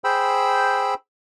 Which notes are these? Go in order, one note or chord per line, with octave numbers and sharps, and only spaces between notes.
G#4 C5 G5 B5 E6